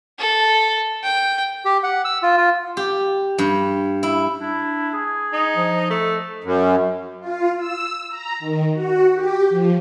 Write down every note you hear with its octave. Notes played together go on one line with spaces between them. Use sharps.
A4
G5
G4
F#5
E6
F4
F4
G4
G2
E4
D4 E4
G#4
D#4
F3
A3
F#2
F4
E6
A#5
D#3
F#4
G4
F3